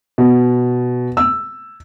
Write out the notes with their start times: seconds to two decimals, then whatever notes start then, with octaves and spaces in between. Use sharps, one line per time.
0.18 B2
1.17 E6